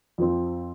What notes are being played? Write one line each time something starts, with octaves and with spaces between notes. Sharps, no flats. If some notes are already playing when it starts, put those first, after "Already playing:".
F2 F3 C4